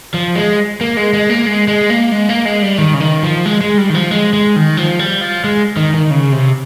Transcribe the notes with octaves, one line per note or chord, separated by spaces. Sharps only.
F3
G#3
A#3
G#3
G#3
A#3
G#3
G#3
A#3
G#3
A#3
G#3
G3
D#3
C#3
D#3
F3
G#3
G#3
G3
D#3
F3
G#3
G#3
D#3
F3
G3
F3
G#3
D#3
D#3
C#3
C3